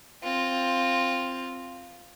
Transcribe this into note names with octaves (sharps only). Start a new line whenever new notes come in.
C4 F4